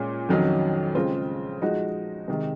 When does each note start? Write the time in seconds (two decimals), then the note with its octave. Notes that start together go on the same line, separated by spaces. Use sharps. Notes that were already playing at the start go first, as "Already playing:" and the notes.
Already playing: A#2 G#3 C#4 F4
0.29 F2 D#3 F#3 C#4
0.95 C#3 G#3 C4 F4
1.62 F3 G#3 D#4 F#4
2.28 C3 D#3 G#3